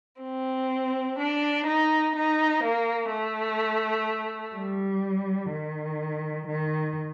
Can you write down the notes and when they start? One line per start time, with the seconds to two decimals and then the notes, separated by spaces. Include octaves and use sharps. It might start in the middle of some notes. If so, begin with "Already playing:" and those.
0.23 C4
1.19 D4
1.67 D#4
2.15 D#4
2.63 A#3
3.11 A3
4.55 G3
5.51 D#3
6.48 D#3